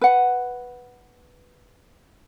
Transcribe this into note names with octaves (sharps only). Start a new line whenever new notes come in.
B4 F#5